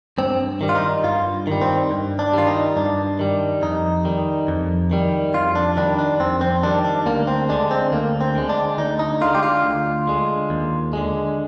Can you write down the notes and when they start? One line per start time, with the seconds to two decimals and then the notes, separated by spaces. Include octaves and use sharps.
0.18 G2 C4
0.61 D#3 G3
0.69 F4
0.75 D#4
1.04 G2 F4
1.47 D#3 G3
1.62 C4
1.91 G2
2.19 D4
2.33 D#3 G3 F4
2.47 D#4
2.76 G2 D4
3.19 D#3 G3
3.62 F2 D#4
4.05 D#3 G3
4.48 F2
4.91 D#3 G3
5.34 F2 F4
5.55 D4
5.77 D#3 G3 D4
5.99 D4
6.20 F2 C4
6.41 C4
6.63 D#3 G3 D4
6.85 D4
7.06 D2 A#3
7.27 C4
7.49 D3 G#3 D4
7.71 C4
7.92 D2 A#3
8.21 C4
8.35 D3 G#3
8.49 D4
8.78 D2 D#4
8.99 D#4
9.21 D3 G#3 F4
9.35 G4
9.43 F4
9.64 D2
10.07 D3 G#3
10.50 D#2
10.93 D3 G#3